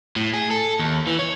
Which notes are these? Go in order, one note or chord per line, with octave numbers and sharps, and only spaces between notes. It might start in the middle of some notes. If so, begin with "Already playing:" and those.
A2
G#4
A4
D#2
E3
C#5